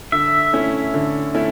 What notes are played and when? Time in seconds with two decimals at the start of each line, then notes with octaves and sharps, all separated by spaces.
0.12 D3 E5
0.53 A3 C#4 E4
0.94 D3
1.34 A3 C#4 E4